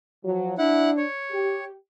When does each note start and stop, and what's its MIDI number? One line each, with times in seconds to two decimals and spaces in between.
0.23 0.56 53
0.23 0.56 54
0.58 1.03 62
0.58 0.90 64
0.58 0.90 78
0.97 1.64 73
1.31 1.71 67